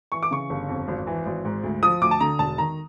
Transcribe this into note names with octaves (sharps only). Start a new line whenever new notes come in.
E3 C#6
D6
C#3 C#6
G1
F2
G#1
E3
G#1
G#2
D2
F3 D#6
D2 D6
A5
D3 A#5
E1 A5
D#3 A#5